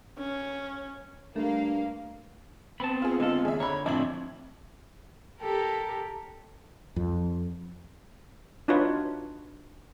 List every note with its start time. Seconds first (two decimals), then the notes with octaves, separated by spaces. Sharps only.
0.18 C#4
1.36 G2 A3 A#3 F5
2.80 B3 C4 A5 B5
3.02 F4 G#4
3.20 D3 G#3 F4 A4
3.45 D#2 C#3 G#4 E5
3.60 D3 C#5 A#5 B5
3.86 A2 D3 F3 C4 D4 E5 G#6 F#7
5.41 G4 A4 A#4
6.96 F2
8.68 D4 D#4 F4 F#4 B4 C#5